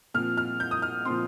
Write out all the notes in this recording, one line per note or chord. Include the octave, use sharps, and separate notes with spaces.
A#2 F3 C4 F6
F6
G6
D#6
F6
A#2 F3 C4 C6